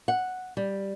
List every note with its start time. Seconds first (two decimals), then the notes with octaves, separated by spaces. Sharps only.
0.08 F#5
0.57 G3